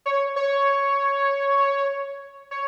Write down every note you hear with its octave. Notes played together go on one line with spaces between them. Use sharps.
C#5
C#5
C#5